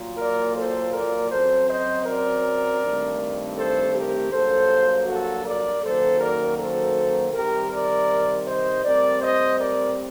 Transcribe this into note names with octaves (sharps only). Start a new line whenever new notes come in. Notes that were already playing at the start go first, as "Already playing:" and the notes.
Already playing: A#2 F#3 A#3
A#4 D5
A4 C5
A#4 D5
F#2 F#3 C4 A4 C5
C5 D#5
A#4 D5
G2 D#3 A3 C4
A4 C5
G4 A#4
G2 F#3 A#3 A4 C5
F#4 A4
A#4 D5
F#2 D#3 F#3 A#3 A4 C5
A#4 D5
A4 C5
C3 D#3 G3 G4 A#4
A#4 D5
C5 D#5
A2 G3 C4 A#4 D5
C5 D#5
A#4 D5